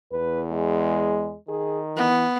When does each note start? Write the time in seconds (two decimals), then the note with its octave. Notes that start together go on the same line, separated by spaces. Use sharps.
0.12 E2 B4
0.51 G#3
1.49 D#3 G#4
1.97 E3 B3